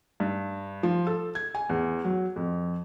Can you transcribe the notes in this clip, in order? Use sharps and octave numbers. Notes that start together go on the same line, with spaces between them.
G2
F3
A4
G#6
G#5
E2
F#3
F2